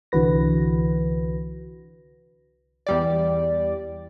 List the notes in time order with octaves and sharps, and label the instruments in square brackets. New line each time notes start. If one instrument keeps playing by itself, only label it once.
[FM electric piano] C2 D3 E3 F#4 B4 A#6
[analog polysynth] E2 G3 D5